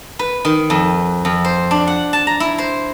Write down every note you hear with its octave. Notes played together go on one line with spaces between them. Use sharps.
B4
D#3
F2
F2
C5
D4
F#5
A5
A#5
E4
C5